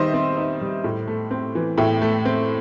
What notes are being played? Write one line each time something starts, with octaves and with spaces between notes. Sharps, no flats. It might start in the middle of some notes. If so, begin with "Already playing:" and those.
Already playing: D#3 G3 C5 D#5 E5
C4
D#4
G3
A2
A3
C4
E3
A2 E5 G5
A3
C4